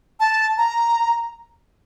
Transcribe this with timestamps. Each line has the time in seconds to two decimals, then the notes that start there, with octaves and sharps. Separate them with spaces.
0.20 A5
0.58 A#5